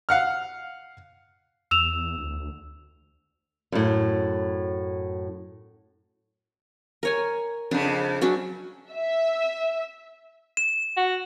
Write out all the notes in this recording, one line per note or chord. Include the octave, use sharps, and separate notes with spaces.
F5 F#5 F6
E2 E6 E7 F7
D2
F#2 A2
A#4 C#5 G#5
F2 C#3 D4
F#3 C#4 D4
E5
E7
F#4